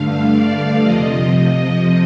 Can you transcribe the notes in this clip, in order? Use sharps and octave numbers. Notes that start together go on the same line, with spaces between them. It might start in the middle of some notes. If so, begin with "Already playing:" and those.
Already playing: G2 D3 A3 F5
D5
F2 C3 F3 D#5